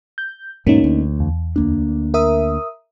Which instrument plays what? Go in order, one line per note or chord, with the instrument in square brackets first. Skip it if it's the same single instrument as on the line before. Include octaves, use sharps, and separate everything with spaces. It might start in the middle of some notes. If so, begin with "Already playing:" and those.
[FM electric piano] G6
[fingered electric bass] E2 G#2 B2 [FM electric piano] A#3 C#4 D#4
[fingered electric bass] D2
[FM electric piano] E2
[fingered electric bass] D2 A#3 D4
[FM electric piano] A#4 E5 D#6